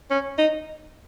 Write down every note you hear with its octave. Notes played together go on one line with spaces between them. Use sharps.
C#4
D#4